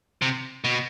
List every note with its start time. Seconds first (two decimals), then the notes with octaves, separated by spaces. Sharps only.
0.22 C3
0.64 B2